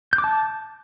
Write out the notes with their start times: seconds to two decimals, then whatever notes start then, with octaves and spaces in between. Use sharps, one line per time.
0.13 G6
0.18 D6
0.24 A5